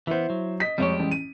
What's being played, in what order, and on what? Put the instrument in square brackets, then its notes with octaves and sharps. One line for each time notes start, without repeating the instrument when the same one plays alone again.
[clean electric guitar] E3 B3 [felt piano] E4 C5
[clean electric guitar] F#3
[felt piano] D#5 B6
[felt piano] F2 C#5 C#6 [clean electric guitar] G3 G#3 G4
[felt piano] A1
D#7